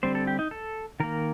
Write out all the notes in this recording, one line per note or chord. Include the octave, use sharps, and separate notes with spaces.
D3 G3 C4 C5
A4
G4
D#4
A4
D#3 A#3 A#4